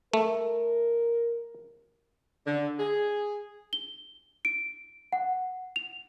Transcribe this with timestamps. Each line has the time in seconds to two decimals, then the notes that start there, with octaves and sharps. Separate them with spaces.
0.13 A3 A#4
2.46 D3
2.79 G#4
3.73 G7
4.45 D7
5.13 F#5
5.76 F7